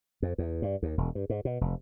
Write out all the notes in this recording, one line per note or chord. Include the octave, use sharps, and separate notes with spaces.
F2
E2
G2
D#2
E1
G2
G#2
B2
F1